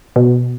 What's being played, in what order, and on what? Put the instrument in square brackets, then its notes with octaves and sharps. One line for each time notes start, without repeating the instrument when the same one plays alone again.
[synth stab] B2